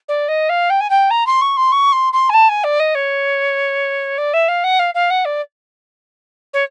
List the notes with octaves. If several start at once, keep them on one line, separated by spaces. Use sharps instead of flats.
D5
D#5
F5
G5
G#5
G5
A#5
C6
C#6
C6
C#6
C6
C6
G#5
A5
G#5
D5
D#5
C#5
D5
E5
F5
F#5
F5
F5
F#5
D5
C#5